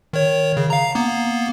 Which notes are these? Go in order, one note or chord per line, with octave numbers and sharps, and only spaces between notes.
D#3 C#5
C#3
F5 A#5
A#3 B3